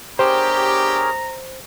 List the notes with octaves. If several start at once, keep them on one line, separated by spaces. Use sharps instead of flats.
B3 D4 G4 G#4 A#4 C5 C#5 A#5